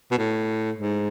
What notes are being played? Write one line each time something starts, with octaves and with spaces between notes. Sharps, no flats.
B2
A2
G#2